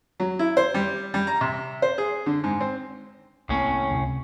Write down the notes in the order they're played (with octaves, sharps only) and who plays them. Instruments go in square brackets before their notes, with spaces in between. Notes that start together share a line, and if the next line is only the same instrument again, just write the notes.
[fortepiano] F#3
E4
C5
G3
G3
A#5
C3
C5
G#4
D3
G#2
C4
[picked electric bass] C2 A#3 C4 [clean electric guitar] A2 C#4
[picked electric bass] C#2 C3